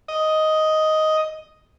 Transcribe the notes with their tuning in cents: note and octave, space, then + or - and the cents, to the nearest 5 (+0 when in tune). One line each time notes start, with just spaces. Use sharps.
D#5 +5